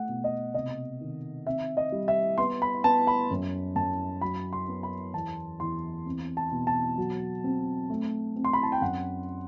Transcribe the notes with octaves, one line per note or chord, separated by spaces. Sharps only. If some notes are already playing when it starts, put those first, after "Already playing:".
Already playing: A3 F#5
B2
D#5
C3 D#5
D#3
C4 E5
D#5
G3
E5
B3 C6
B5
B3 A5
B5
F#2
F#2 A5
F#3 B5
C6
B3
B5
E2 A5
E2 C6
C4
A5
B2
A5
F#3
C4
A3
C4
C6
B5
A5
G5
F#2 F#5